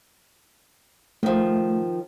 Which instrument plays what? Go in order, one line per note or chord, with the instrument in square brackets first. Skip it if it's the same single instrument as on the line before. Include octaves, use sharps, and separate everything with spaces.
[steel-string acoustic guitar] D#3 F3 [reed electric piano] A3